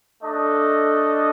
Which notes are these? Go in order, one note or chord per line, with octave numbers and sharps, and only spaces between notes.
A3 D4 A4 D#5